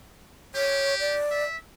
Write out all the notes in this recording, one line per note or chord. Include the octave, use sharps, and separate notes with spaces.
G4 C#5
D5
E5